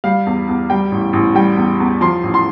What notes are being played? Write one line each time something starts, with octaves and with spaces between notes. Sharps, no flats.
G3 F5
E2
E2
G3 G5
A1
A1
G3 G5
E2
E2
F3 C6
A1
C6